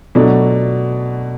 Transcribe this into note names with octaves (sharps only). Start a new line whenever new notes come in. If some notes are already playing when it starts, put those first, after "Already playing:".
B2 F#3 A3 D4